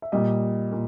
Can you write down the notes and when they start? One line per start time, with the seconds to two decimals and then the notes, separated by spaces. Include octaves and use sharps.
0.02 E5
0.12 A#2 G3 D#5
0.72 A#2